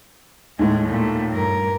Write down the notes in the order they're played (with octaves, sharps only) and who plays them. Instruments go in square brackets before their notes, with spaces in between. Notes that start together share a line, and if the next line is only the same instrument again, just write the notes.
[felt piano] D#2 A2 [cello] G#3
[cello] A#2 A3
G2 A#4